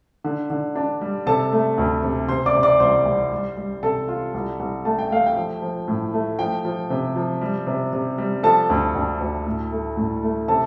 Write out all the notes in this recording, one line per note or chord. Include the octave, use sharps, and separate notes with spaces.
D3
D3
D4
G3
C3 A4 A5
A3
D2
C3
C3 C5 C6
D5 D6
C3
D5 D6
C2 C5 C6
C2
G3
G3
C3 A4 A5
F4
C2
C2
A3 A5
G5
A3 F5
G5
F3
F3
A2
A3
F3 G5
F3
C3
F3
G3
C3
C3
G3
F3 A4 A5
D2
D2
D2
A2
A3
A2
A3
C3 A4 A5